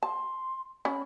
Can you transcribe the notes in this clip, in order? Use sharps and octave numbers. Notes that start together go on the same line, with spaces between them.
A5 C6
C#4 B5